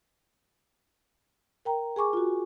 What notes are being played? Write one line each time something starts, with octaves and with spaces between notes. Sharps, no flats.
A#4 G5 A#5
G#4 G#5 C#6 D6
F4 F#4